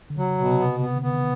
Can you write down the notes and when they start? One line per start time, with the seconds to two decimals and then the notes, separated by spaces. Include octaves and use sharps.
0.10 D3
0.17 C#3 F#3
0.38 B2
0.48 C3
0.59 B3
0.80 C3 B3
0.96 D3
1.02 B3
1.13 D#3